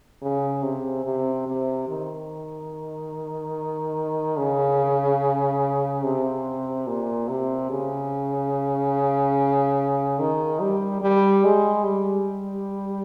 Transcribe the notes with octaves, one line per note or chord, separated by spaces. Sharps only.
C#3
C3
C3
C3
D#3
C#3
C3
A#2
C3
C#3
D#3
G3
G3
G#3
G3